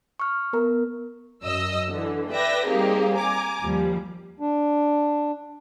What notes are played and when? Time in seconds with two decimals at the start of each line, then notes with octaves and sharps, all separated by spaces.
0.20 C#6 F6
0.53 B3 A#4 A#5
1.44 F#2 D#5 E6
1.89 D3 E3
2.32 B4 D5 E5 G5 A#6
2.66 G3 A#3 C4 D#4 G4 G#4
3.16 G#5 A#5 D6
3.61 D#2 F3 G3
4.40 D4